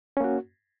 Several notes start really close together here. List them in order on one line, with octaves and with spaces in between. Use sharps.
C#4 A#3 F#4